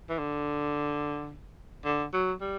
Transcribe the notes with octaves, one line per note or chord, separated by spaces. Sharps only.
E3
D3
D3
F#3
G3